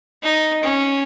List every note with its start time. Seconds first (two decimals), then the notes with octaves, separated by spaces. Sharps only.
0.23 D#4
0.63 C#4